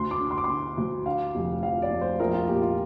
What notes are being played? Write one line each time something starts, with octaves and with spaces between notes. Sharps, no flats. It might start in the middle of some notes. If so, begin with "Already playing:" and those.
Already playing: D2 C6
D6
D3
C6
D6
C6
D3
D2
D3 F5
F1
F2 F5
D5
F1
C5
A#1 A#4
F4
A#2 G4
F4